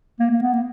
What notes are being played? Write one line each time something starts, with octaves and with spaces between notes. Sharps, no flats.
A#3
A#3
B3
A#3